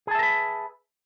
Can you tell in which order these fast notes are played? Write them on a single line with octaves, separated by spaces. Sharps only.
G#4 A5 E5 A#4 B4